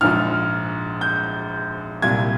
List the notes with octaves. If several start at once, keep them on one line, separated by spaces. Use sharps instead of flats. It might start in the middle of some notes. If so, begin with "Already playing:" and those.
A#1 G#2 F3 F6
G6
C2 A#2 G3 G#6